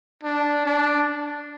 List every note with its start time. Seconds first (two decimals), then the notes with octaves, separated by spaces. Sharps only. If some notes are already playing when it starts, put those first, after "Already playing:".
0.23 D4
0.66 D4